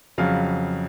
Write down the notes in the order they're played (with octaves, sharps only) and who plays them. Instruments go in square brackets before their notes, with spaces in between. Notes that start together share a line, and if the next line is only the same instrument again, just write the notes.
[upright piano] F2 C#3 F#3 F5